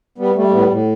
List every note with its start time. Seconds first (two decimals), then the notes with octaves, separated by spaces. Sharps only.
0.18 G3 B3
0.35 G3 A3
0.47 A3
0.52 A2 B3
0.70 A2